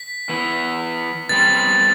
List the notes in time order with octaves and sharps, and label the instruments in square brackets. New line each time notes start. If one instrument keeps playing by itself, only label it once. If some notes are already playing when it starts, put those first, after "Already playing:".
Already playing: [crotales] B6
[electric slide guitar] E3 B3 E4
[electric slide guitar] B2 G3 C4 [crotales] A6